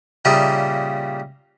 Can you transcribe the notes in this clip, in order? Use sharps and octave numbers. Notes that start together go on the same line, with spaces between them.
A#2 C#3 G3 A#3 D#5 E5